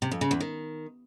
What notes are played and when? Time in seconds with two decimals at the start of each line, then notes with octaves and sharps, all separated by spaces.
0.02 C3
0.12 F2
0.21 C#3
0.31 E2
0.40 D#3